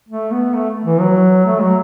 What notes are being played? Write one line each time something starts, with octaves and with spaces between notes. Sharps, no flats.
A3
B3
A3
E3
F#3
A3
F#3